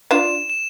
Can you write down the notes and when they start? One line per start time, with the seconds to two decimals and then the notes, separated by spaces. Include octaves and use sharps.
0.11 D4 F4 E7
0.49 E7